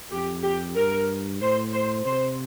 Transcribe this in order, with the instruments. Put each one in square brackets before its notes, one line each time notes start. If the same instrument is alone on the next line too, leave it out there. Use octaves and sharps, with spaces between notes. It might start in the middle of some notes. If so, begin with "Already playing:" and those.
[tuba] F2 [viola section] G4
[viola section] G4
[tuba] G2 [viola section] A#4
[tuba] A2 [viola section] C5
[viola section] C5
[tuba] C3 [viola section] C5